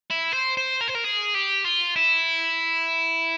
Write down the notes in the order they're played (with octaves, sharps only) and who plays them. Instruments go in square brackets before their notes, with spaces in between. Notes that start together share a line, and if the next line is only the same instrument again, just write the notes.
[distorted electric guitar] E4
C5
C5
A#4
C5
A#4
G#4
G4
F4
E4